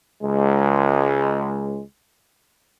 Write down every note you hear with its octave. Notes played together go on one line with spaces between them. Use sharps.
C#2 G#3